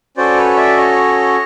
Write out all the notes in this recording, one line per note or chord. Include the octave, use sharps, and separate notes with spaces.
C#4 F#4 A4 C5 D5
B4 C#5
D5 E5
C#5 D#5